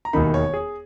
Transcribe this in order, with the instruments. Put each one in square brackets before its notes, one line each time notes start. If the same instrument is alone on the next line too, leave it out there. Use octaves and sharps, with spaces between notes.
[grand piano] A#5
E1 D#2 D#3 A#3 D#4 B5
C#5
G#4